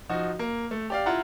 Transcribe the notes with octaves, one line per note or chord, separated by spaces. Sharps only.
F3 D#4 F#4
A#3
A3
G4 D5 F5
E4 F4 F#5 A#5